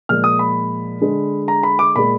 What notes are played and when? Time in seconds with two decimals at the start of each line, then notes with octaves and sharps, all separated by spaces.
0.09 A#2 F3 G#3 F6
0.24 D#6
0.39 B5
1.01 D3 G#3
1.48 A#5
1.63 B5
1.79 D6
1.96 A#2 G#3 B5